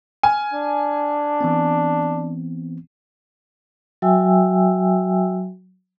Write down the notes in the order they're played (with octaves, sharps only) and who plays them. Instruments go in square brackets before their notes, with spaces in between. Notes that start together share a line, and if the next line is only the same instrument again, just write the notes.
[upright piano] G#5 [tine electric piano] F6
[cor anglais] D4
[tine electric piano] E3 B3 C4
[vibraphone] F#3 F#4 E5 G5 G#5 E6